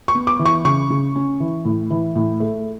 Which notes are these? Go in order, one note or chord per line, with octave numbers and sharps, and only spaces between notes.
C#6
B3
D6
E3
C#6
C#3 C#6
C#3
C#4
E3
A2
E3
A2
A3